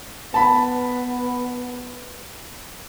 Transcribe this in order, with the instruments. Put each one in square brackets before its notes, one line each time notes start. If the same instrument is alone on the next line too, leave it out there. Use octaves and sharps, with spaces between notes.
[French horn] B3 [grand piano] A5 B5